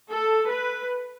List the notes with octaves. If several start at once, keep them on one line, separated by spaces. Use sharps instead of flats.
A4
B4